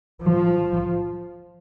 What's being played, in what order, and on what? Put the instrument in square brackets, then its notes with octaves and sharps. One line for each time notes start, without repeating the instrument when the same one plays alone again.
[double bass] F3